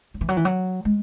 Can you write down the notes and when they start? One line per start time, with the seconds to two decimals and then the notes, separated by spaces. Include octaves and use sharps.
0.14 F#3
0.21 E3
0.29 F#3
0.37 E3
0.45 F#3
0.85 G#3